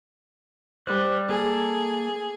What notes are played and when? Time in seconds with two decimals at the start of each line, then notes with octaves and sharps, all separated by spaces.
0.87 G3 C5 F#6
1.29 A#3 G#4 A4